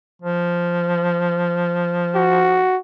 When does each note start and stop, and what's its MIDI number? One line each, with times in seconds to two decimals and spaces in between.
0.22 2.65 53
2.15 2.78 66